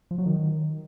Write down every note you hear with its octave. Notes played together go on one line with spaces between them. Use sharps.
F3
F#3
D#3